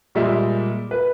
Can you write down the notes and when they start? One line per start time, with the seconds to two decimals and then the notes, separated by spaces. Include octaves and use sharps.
0.15 A#2 G3 G#3 E5
0.91 B4